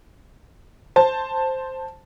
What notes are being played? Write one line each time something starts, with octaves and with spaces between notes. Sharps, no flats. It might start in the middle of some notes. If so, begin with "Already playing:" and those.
C5 A5